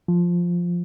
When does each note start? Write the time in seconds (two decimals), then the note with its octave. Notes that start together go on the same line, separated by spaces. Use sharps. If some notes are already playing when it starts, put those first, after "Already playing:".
0.08 F3